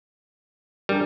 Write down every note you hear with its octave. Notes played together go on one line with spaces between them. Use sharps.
G3 D4 G#4 A#4